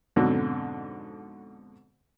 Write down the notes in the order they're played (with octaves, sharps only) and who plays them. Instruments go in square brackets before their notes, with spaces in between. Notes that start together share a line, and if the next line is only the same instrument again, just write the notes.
[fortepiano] F2 G#2 B2 D3 F#3